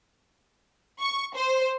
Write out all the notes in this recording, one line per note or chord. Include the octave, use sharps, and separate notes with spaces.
C#6
C5